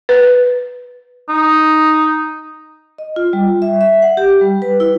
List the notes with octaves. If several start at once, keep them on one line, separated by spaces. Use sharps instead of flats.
B4
D#4
D#5
F4
G3
E5
E5
F#5
G4
G3
B4
E4